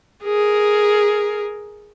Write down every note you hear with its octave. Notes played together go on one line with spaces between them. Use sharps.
G#4 A#4